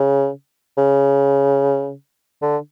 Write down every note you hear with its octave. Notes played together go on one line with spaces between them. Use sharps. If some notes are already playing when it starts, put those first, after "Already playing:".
Already playing: C#3
C#3
D3